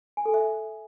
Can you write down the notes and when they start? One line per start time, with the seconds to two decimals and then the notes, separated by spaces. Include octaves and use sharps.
0.17 G#5
0.26 A4
0.34 E5